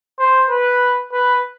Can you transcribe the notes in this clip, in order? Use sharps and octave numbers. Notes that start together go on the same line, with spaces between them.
C5
B4
B4